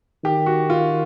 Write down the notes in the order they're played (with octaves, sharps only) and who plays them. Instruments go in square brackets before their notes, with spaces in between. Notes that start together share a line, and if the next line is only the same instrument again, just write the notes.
[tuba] D#3 [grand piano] G4
[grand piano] F#4
F4